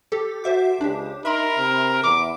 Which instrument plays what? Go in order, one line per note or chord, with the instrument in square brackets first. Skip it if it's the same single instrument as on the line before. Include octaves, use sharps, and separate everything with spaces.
[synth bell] G4 A4
[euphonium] F#4 [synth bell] C5 E5 D6
[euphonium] C#2 [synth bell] D4 G4
[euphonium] D#4 [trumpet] A#4 [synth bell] E5 B5 C6
[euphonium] C3
[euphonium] E2 [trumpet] D6